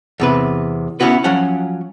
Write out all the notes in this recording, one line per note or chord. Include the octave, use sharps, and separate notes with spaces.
E2 C3 B4
B3 C#4 E4 F#4 B4
F3 F#3 C#4 F#5